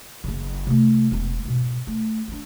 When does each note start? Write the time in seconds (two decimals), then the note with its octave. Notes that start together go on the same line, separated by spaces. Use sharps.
0.24 F#1 C#3
0.67 C3 A3
1.12 E1 B3
1.45 G#2 B2
1.87 A3
2.28 C4 D4